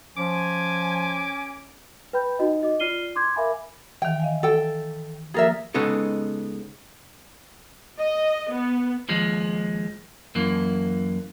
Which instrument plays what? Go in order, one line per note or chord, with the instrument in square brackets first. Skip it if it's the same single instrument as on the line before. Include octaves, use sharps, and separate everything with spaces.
[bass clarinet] F3 [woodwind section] C#4 [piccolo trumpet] G#5 [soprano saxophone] D6
[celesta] B4 G5 B5 G6
D#4 F#4 D#5
D#5 D6
F4 D5 F6 C7 D#7 G7
C6 D6 G6 G#6
A#4 E5 F5 G#5 B5 D6
[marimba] D#3 E3 [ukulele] G5
[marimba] D#5 F5 G#5
[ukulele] A4 G5
[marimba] F3 A#3 A6 [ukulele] G#4 A#4 E5
[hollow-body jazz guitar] C#3 G#3 B3 D#4 A4
[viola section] D#5
B3
[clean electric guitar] D#2 F3 G#3
F#2 E3 A#3